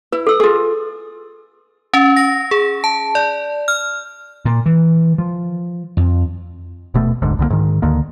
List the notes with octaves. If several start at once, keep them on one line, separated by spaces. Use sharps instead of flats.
E4 B4
A4 E6
F4 G#4 A4
C#4
A#6
G#4
A5
D5
F6
A#2
E3
F3
F2
D#1 B2 A3
E1 D2 G#2 D3
C2 D3 E3 A#3
G#2 D#3
D2 D3 D#3 A#3